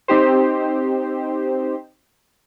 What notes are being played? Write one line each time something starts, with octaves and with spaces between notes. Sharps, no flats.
C4 D#4 G4 C5